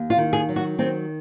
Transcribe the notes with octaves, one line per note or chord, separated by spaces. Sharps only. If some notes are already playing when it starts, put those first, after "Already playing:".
Already playing: D#2
F4
D#3
G#4
F#3
F#4
D#3 C4